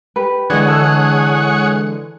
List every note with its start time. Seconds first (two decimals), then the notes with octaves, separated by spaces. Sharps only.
0.16 G4 B4
0.50 D3 E3 G#3 G#4 C#5 F#5
0.68 A4